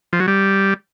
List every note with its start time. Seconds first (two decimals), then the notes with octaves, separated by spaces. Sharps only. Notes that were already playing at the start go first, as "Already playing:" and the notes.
0.13 F3
0.20 F#3
0.28 G3